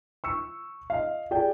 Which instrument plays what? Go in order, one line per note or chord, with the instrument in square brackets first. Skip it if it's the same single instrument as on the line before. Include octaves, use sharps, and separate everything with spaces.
[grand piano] C#6 E6 C#7
D#5 F5
G4 G#4 D5 G5